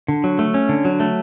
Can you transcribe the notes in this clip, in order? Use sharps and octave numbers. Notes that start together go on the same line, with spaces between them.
D3
F#3
A3
C#4
D3
F#3
A3